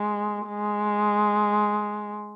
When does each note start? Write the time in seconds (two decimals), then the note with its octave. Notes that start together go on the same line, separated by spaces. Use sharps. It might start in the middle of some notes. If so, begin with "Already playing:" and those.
Already playing: G#3
0.47 G#3